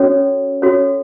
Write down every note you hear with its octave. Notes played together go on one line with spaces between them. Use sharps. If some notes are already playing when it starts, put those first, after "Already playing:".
Already playing: C#4 F#4 A4 C#5
C#4 F#4 A4 C#5